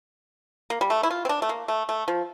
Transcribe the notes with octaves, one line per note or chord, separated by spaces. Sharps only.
A#3
G3
A3
E4
F4
C4
D4
A3
A#3
A3
A3
F3